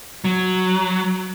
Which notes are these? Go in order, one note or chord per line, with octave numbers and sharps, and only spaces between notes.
F#3